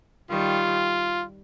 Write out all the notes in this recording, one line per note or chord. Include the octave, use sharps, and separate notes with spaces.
D#3 G3 F4